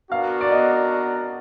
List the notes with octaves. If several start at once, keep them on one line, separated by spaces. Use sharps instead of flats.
B3 D4 F#4 A#4 F5
D5
D#5